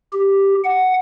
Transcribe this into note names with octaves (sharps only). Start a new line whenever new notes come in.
G4
F#5